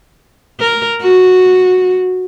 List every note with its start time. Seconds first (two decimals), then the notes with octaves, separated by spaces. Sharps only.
0.60 A#4
1.02 F#4